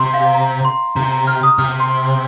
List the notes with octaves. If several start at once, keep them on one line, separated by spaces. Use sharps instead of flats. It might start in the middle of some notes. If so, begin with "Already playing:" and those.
Already playing: C3 C6
F5
A#5
C6
C3 A#5
A#5
F6
D#6
C3 F6
C6